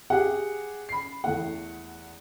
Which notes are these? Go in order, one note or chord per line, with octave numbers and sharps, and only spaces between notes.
G4 G#4 F#5
B5 C7
E2 A3 F#5